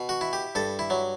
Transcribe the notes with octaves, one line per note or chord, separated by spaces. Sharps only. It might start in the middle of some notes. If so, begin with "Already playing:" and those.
Already playing: B2
F#4
E4
G4
G2 A4
E4
F#3